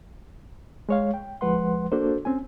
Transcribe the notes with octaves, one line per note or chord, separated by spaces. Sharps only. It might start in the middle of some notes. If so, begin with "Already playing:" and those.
G#3 C#5 F5
G5
D2 F3 G#3 B4 F#5 C6
A#3 D4 F#4 A4 C5
C4 C#4 G#5